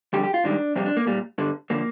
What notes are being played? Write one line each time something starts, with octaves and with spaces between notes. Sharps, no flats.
F2 D3 G3 G4
G4
F4
G#2 D#3 G3 D4
F2 C3 G3 C4
D4
A#3
A#2 G3
G2 D3 G3
D3 F3 A#3